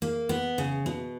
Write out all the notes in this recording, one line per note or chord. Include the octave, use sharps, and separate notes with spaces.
A#3
B3
C#3
B2